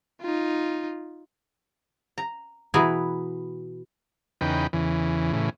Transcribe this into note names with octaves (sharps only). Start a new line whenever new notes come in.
D#4 F4
A#5
B2 E3 G#4 B4 G#5 A#5
E2 C#3 D#4 B4 G5
E2 C#3 E3
A2 C#3 E3